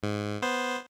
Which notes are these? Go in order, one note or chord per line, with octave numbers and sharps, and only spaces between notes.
G#2
B3 C5